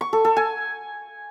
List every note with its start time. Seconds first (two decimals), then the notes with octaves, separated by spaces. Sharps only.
0.01 C#6
0.13 A4
0.25 A4
0.36 G#5